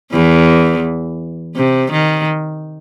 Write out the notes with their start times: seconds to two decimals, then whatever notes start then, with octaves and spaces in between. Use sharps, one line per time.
0.12 E2 E3
1.56 C3
1.92 D#3